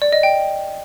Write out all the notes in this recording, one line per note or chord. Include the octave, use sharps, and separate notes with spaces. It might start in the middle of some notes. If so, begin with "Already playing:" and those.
D5
D#5
G5